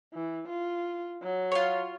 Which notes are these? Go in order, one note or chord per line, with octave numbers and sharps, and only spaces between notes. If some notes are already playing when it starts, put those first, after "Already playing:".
E3
F4
F#3
F4 C#5